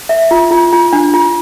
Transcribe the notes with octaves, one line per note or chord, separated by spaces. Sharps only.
E5
F4
F4
F4
D4
F4